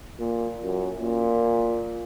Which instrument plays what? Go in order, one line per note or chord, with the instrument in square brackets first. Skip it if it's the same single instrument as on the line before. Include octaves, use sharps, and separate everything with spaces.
[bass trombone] A#2
F#2
A#2